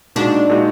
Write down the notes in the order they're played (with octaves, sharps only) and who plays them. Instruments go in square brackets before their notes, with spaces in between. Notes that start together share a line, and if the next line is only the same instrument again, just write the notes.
[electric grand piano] A#2 G#3 D#4 F#4 [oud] D4
[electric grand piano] A#2 G#3 D#4 F#4